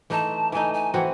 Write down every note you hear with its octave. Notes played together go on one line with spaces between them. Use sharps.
E3 A3 D#4 A5
E3 A3 D#4 G#5
G#5
E3 C4 F#4 F#5